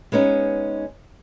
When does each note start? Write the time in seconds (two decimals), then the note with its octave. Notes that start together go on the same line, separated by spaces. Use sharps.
0.12 G#3 B3 C#4 D#4